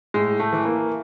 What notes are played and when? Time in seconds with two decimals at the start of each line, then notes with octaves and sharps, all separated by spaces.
0.14 A2 G#3
0.40 A3
0.52 E3
0.65 A#3